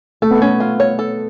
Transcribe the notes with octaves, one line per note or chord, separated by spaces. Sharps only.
A3 A4
B3
A3 C#4
F4
C#5
A4